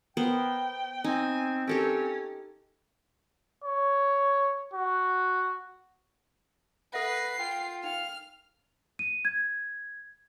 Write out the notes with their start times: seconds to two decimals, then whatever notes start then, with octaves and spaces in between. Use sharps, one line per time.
0.17 B3 A#4 C5 G5
1.04 C4 D#4 G#5
1.67 C#4 G4 A4 A#4
3.64 C#5
4.73 F#4
6.94 A4 B4 E5 F#5 A#6 C7
7.39 F4 G5
7.84 D#4 F5 G5 F6
8.99 D#7
9.25 G#6